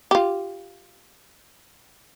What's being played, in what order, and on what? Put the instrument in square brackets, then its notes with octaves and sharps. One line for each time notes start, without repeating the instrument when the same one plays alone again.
[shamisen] F4 G4